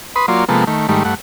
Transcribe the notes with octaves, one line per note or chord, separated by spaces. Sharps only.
B4 B5 C6 D#6
F#3 A#3 F4 D5 C6
C3 F3 G#3 A#3 B3 A4
D#3 A3
G#2 D#3 G3 A3
G2 A3 F#5